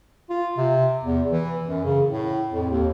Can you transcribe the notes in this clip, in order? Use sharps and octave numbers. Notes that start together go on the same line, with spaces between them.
F4
C3
E2
E3
F#2
C#3
A2
F2
D#2